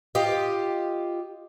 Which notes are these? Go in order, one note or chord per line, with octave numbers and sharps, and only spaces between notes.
F4 G4 D#5